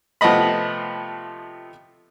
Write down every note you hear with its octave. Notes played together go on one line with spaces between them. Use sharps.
C3 F3 A3 B3 D#5 B5